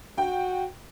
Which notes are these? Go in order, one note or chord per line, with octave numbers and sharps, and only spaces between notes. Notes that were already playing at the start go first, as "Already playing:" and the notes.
F#4 G5